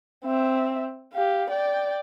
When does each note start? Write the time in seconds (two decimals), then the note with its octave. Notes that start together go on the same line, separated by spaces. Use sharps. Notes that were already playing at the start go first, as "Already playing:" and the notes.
0.24 C4 E5
1.13 G4 F5
1.50 D5 G5